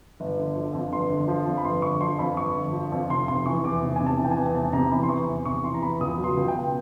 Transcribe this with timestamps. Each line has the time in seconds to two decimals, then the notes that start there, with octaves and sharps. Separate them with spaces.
0.20 G1
0.37 D3
0.55 F3
0.73 F2
0.92 G1 C6
1.10 D3
1.28 F3
1.46 F2
1.57 B5
1.65 G1 C6
1.82 D3 C#6
2.01 F3 C6
2.19 F2 B5
2.37 G1 C#6
2.56 D3
2.73 F3
2.92 F2
3.10 F1 C6
3.28 C3 C6
3.46 E3 C#6
3.64 E2 D6
3.82 F1
3.96 C3 G#5
4.06 A5
4.19 E3
4.24 G5
4.31 G#5
4.37 E2
4.55 F1 A5
4.73 C3 A#5
4.91 E3 B5
5.03 C6
5.09 E2 C#6
5.27 F1
5.45 C3 C#6
5.64 E3 C6
5.74 A#5
5.82 E2 B5
6.01 C#2 D#6
6.18 F#3
6.24 C6
6.37 C#2
6.48 G5
6.55 B2